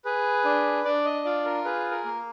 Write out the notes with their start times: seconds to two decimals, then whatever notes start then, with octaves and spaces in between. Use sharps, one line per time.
0.05 G#4 B4
0.45 D4
0.85 D4 D5
1.05 D#5
1.25 F4 D5
1.45 A#4
1.65 G#4 B4
1.91 A#4
2.05 A#3